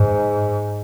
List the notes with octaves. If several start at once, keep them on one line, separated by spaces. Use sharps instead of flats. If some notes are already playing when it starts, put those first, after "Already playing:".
Already playing: G#2